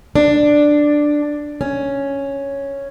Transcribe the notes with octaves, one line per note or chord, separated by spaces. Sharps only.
D4
C#4